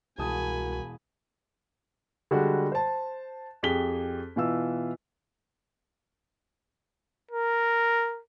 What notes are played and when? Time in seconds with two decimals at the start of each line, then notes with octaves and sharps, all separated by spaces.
0.18 E1 C2 F#4 A#4 G#5 A5 B5 D#6
2.31 D3 G3 G#3 F#4 G#4
2.72 C5 A5
3.63 F2 G4 G#4 B6 G7
4.36 B2 E3 F4 E6
7.31 A#4